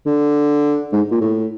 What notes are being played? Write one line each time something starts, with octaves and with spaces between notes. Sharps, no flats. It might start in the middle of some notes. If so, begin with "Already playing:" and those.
D3
G#2
A#2
A2